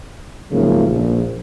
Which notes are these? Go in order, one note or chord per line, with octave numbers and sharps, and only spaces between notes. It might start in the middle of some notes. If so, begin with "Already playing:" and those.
G#2 C#3 F3 F#3 A3 A#3
A#1